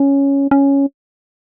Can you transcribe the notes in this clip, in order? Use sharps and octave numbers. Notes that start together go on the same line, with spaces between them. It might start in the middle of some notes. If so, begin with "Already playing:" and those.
Already playing: C#4
C#4